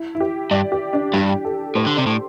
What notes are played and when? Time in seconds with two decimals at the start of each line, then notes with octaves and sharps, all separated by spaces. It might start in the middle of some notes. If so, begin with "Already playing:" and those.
Already playing: E4
0.15 E4
0.20 G4
0.51 G2 D5
0.72 G4
0.93 D4
1.14 G2 G4
1.45 A4
1.75 A2 C5
1.86 D3
1.97 C3 D5
2.06 A2